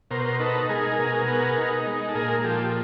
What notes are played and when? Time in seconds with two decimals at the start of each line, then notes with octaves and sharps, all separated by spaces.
0.11 B2 A#4 C5
0.25 A#4 C5
0.39 D#4 A4 B4
0.69 G#3 G#4 A#4
0.99 B2
1.28 B3
1.57 D#4
1.86 G#3
2.09 A4
2.15 A#2 G#4 A#4
2.44 F3 G4 A4